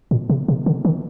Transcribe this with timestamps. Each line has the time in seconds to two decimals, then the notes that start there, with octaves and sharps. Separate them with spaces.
0.11 A#2
0.30 C3
0.48 C3
0.66 D3
0.85 D#3